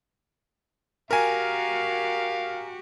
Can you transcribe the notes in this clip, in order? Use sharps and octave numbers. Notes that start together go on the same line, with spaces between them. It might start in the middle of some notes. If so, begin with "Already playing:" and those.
F#4 G4 A#4 F5 G#5